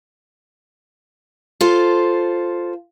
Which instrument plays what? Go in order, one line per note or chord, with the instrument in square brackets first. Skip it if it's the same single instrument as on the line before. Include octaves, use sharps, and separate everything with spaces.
[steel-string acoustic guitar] F4 A4 C5